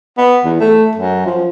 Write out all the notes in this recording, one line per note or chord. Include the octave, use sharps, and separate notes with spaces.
B3
E2
A3
F#2
F3